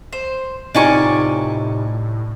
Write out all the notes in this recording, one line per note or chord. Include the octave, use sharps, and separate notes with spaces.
C5
A2 C3 D#4 F4 D5 G#5 C#6